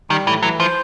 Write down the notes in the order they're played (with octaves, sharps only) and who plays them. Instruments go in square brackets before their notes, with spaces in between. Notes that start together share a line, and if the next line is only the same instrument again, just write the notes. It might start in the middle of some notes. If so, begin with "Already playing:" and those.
[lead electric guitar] D#3 [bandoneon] G3
[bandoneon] A2 [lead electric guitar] E3
[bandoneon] E3 [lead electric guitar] F#3
[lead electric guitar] F3 [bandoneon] C5